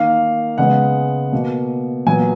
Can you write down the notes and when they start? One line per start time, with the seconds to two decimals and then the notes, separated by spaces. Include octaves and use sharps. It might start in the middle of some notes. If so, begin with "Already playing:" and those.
Already playing: D#3 A#3 F5
0.58 C#3 G#3 B3 F#5
1.32 B2 A#3
2.06 A#2 F#3 B3 G#5